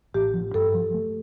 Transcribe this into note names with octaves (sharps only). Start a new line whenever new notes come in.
A1 G4
F3
G2 A4
F3
A3